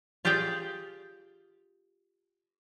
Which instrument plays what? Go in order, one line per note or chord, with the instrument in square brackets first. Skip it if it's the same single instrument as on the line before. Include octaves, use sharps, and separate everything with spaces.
[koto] F4 G4 G#4 D5 G5